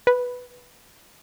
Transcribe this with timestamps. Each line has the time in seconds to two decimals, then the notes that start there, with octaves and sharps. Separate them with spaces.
0.07 B4